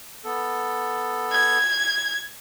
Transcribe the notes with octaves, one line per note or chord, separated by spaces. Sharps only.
B3 A4
G#6